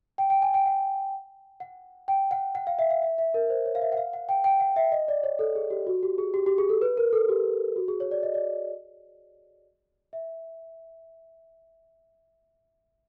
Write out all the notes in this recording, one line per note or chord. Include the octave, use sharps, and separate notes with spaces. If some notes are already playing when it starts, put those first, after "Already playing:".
G5
G5
G#5
G5
F#5
F#5
G5
F#5
F#5
F5
E5
F5
E5
E5
A#4
C5
C#5
F5
E5
F#5
F5
F#5
G5
G5
F#5
E5
D#5
D5
C#5
A4
G#4
G4
F#4
G4
G#4
G4
G4
G#4
A4
B4
A#4
A4
G4
F#4
G#4
C#5
D5
D#5
D5
E5